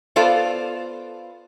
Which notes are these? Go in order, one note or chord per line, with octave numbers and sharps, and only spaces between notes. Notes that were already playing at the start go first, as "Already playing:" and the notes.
B3 F4 A4 C5 D5 F5